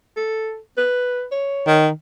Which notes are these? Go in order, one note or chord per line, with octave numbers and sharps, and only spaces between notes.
A4
B4
C#5
D#3